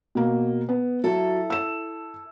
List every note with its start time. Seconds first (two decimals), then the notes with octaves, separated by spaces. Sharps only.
0.15 B2 A#3
0.69 B3
1.04 F#3 E4 A4
1.50 E6 E7